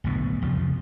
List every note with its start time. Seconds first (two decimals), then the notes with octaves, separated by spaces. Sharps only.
0.04 B1 A2 D3 B3
0.42 C2 F2 C#3 F3